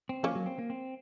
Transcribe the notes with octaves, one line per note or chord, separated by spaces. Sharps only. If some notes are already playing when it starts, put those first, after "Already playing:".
C4
F3 A#3 C#4
F#3
C4
A#3
C4